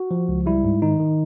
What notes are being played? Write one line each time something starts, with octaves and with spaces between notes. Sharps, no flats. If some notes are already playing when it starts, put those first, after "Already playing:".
Already playing: F#4
F3
C#2
G3 E4
G#2
D#3 D#4
D#3